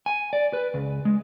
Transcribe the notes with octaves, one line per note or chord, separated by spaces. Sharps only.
G#5
D5
B4
C#2
G#3